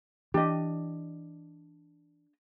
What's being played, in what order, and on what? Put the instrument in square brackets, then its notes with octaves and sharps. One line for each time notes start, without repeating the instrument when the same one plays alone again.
[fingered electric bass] E3 [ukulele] D4 D#5 [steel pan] G4